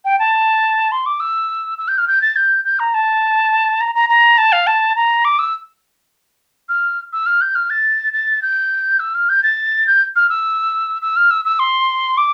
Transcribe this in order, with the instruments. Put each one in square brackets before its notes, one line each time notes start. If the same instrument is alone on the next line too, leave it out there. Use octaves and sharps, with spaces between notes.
[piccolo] G5
A5
C6
D6
E6
E6
G6
F6
G6
A6
G6
G6
A#5
A5
A#5
A#5
A#5
A5
F5
A5
A#5
D6
E6
F6
E6
F6
G6
F6
A6
A6
G6
E6
F6
G6
A6
G6
F6
E6
E6
F6
E6
E6
C6
D6